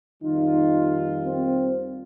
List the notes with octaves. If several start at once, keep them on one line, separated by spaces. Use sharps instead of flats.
F2 D#3 G3 A#3 D#4 F4
C4